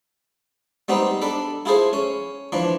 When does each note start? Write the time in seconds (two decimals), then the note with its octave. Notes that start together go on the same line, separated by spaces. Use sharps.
0.88 G3 B3 C4 D#4 G4
1.22 D4 A4 B5
1.66 E4 F4 G#4 A4 C5
1.93 C#4
2.52 E3 F3 D4